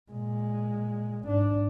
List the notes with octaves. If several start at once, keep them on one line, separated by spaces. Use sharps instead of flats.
A#2 G#3
G#1 D4